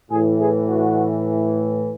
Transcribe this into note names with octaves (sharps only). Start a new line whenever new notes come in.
A2 E3 G#4
G#4
F#4